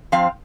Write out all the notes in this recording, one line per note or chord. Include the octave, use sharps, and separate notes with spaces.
F3 C4 F5